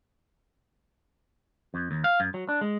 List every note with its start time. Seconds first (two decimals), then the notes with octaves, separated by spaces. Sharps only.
1.74 F2
1.91 D#2
2.04 F5
2.20 F#2
2.34 F#3
2.49 D4
2.61 G#3